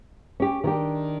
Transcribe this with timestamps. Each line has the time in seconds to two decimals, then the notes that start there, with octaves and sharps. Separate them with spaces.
0.40 C#4 G4
0.64 D#3 D4 G4